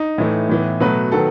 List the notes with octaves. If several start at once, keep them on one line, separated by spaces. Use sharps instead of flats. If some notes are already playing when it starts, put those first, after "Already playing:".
Already playing: D#4
A2 E3 A3
A2 E3 B3
B2 F#3 A3 B4
D#3 F#3 B3 A4